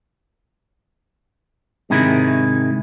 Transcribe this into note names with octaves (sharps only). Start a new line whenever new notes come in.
G#2 C3 D#3 G#3 E4